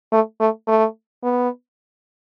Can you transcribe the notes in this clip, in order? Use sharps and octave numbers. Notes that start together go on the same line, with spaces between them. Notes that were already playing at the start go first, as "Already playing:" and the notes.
A3
A3
A3
B3